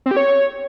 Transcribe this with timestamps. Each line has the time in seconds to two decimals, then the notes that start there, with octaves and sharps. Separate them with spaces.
0.06 C4
0.11 G4
0.17 C#5